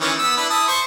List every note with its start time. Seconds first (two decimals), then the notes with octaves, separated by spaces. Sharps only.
0.01 D#3 E3 C#4
0.19 B3 E6
0.37 D4 E4 B4
0.50 E4 A5 D#6
0.68 C5 C#6